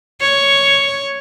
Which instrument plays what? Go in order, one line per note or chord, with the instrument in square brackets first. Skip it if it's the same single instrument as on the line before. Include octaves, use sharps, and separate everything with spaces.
[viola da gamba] C#5